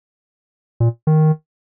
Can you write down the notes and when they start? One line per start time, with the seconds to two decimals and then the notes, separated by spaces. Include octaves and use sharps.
0.80 A#2
1.07 D#3